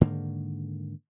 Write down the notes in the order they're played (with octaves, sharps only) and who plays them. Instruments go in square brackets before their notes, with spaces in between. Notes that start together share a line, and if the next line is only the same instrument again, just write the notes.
[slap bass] G#2 D3 D#3 A#3